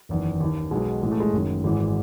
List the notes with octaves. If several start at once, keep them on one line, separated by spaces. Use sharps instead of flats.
F#1 E2 D#3
D#2 D#3
B1 B2 G#3
A1 A2 E3 G#3
A3
G#3
F#1 F#2 D#3
G#1 G#2 E3 G#3